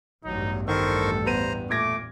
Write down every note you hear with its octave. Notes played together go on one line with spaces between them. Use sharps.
A1 E2 G2 F#3 D#4
D#3 A4 A#4 C5 C#6
B3 C5 A#5 D#7
A#2 A3 D6 G#6 A#6